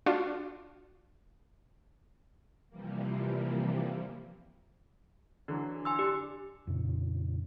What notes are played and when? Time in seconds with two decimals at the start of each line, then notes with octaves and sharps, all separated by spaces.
0.06 D4 F4 F#4
2.69 C3 E3 F3 G3 A#3
5.48 D3 E3 F#3
5.85 G#5 C6 E6
5.99 D4 G4
6.67 F2 A#2 C#3